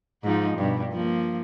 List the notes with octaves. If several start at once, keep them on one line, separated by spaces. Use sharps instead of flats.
G#2 F3 D#4
G2 B2
F3 A#3